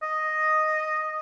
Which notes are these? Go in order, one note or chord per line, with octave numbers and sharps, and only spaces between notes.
D#5